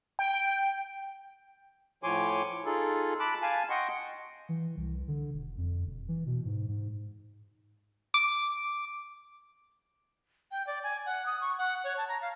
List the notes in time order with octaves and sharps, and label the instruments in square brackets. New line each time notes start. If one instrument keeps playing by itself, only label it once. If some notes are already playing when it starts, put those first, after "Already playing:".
[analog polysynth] G5
[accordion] A2 F3 C#5 G#5 C6 D6
D#4 F4 G#4 A4
A5 B5 D6 F#6
F5 G#5 A5
D#5 F#5 G5 C6 C#6
[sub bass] E3
C2
D3
E1
F2
E1
E3
B2
G#2
G#2
[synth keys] D6
[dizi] G5
D5
G#5
F#5
D#6
C#6
F#5
C#5
A5
A#5
F5